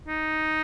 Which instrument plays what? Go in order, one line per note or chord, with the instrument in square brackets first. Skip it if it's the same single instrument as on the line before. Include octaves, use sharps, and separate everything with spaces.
[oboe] D#4